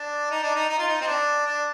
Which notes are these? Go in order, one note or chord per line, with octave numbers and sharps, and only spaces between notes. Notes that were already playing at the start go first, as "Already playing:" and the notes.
Already playing: D4
D#4
D4
D#4
D#4
F4
D#4
C4
D4
D4